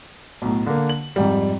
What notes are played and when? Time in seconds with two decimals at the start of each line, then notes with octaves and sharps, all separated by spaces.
0.42 B1 A2
0.66 D3 A#3
0.89 F#7
1.16 F2 G#2 G3